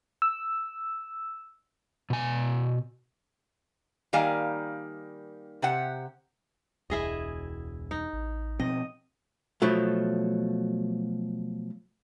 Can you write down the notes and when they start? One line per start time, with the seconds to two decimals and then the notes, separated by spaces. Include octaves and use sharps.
0.22 E6
2.10 B2 G#5
4.13 D#3 G3 A#3 F5 G#5
5.62 C3 G4 F#5
6.90 E1 C#2 E4 G#4 D#5
7.91 D#4
8.13 A1
8.60 B2 F3 C4 D#5
9.62 B2 F3 F#3 A3